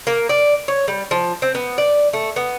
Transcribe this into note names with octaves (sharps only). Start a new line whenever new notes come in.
A#3
D5
C#5
G3
F3
C4
B3
D5
A3
B3